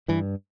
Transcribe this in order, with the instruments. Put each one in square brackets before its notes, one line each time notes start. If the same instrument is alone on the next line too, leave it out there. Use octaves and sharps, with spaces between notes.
[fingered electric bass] G2 E3